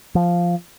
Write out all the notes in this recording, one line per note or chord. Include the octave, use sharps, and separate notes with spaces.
F3